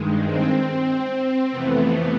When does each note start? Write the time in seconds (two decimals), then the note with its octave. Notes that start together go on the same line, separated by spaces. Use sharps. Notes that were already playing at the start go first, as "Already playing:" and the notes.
Already playing: G2 D#3 G#3
0.23 C4
1.50 F2 C3 E3 A3 B3